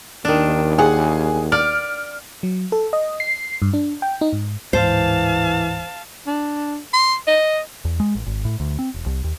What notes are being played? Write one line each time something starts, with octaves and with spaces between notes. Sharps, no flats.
D#2 D#3 D4
G#4 F#5
D5 F6
F#3
A4
D#5
C7
G2
D4
G5
D#4
G#2
D1 G#2 E3 C5 F5 A5
D4
C6
D#5
E2
G#3
A1
G#1
A2
D2
C4
E1
C2
D#2